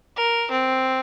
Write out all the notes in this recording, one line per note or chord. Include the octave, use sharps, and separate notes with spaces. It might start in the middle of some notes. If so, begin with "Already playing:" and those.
A#4
C4